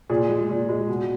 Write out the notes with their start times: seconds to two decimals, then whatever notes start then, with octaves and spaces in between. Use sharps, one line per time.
0.09 A#2 G#4
0.29 G#3
0.49 A#2
0.69 G#3
0.88 B2